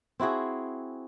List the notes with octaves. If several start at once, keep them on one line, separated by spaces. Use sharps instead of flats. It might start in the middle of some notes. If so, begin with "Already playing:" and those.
C4 E4 F#4 G#4